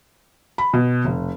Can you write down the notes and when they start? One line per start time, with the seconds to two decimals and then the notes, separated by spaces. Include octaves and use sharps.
0.58 B5
0.73 B2
1.05 F1